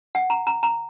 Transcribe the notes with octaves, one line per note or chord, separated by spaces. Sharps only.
F#5
A#5
A#5
A#5